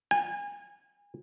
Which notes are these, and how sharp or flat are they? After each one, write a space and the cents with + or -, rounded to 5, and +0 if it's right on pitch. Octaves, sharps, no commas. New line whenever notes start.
G#5 -30